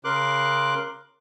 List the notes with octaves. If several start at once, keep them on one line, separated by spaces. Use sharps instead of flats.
C#3 A#4 C6 D6 F#6